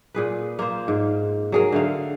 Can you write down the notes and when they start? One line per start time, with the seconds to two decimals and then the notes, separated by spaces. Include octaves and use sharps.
0.14 A#2 G#4 B4
0.59 A#3 F4 C5
0.88 G#2
1.52 F#3 G#4 A#4
1.72 D3 A3 F5